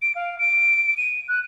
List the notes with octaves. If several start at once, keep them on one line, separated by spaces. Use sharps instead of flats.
D7
F5
D7
D#7
F#6